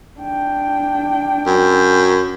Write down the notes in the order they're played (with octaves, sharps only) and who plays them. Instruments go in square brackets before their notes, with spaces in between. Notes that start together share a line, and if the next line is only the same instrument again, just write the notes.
[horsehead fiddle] D4 G5
[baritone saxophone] F#2